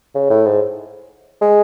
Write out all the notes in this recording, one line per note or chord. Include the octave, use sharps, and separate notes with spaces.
C#3
A2
G#2
G#3